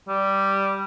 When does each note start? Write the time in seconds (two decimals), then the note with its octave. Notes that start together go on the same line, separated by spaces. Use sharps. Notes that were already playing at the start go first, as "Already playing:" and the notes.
0.09 G3